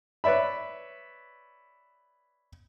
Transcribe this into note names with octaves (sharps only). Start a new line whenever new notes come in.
B4 C#5 D5 E5 B5